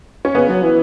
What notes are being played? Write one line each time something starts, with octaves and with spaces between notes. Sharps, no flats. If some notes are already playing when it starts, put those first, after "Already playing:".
C#4
C#3 B3
F#3
E3